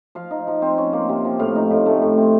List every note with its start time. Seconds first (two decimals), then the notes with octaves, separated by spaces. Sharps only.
0.15 F3 F5
0.31 D#4
0.47 F3
0.62 C4
0.78 C#4
0.93 A#3
1.09 C3
1.25 F3
1.39 A2 F5
1.55 D#4
1.71 A2
1.86 A3
2.02 A2
2.17 C4